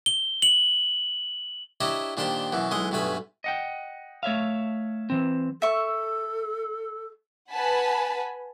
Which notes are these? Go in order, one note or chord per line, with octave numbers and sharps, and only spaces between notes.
G7
F#7
D4 E4 G4 C#5 D#5 A#5
A#2 D#3 D4 G4 C5 C6
F#2 B2 E3
B1 E3 G#3 C6 D#6
B1 G2 B2 A3 G#5 B5
D#5 F#5 G5
A3 C#5 E5 F5
E3 C4
A4 E5 C#6
B4 F#5 G#5 A5 B5